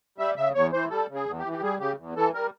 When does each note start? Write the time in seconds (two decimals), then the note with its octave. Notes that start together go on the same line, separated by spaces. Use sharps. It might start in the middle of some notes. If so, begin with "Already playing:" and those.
0.18 G3 E5
0.36 C#3 E5
0.55 E2 C#5
0.73 E3 C5
0.90 G3 A4
1.09 C#3
1.15 G#4
1.26 E2
1.39 G4
1.45 E3
1.53 G4
1.62 G3 G#4
1.80 C#3 G4
1.98 E2
2.15 E3 A4
2.34 G3 A#4